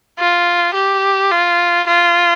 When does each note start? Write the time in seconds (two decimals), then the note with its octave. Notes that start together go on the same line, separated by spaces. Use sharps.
0.19 F4
0.74 G4
1.31 F4
1.87 F4